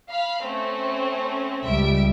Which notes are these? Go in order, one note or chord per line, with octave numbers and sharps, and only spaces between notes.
F5 B5
A3 C4 C#4
C#2 G3 E5 D7